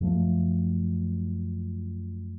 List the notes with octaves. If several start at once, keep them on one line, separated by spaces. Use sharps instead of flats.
F#2 F3 A3